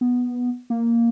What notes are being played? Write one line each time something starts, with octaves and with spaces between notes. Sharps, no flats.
B3
A#3